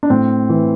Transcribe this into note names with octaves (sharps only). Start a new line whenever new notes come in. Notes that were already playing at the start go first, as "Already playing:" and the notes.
D4
A2 C4
E3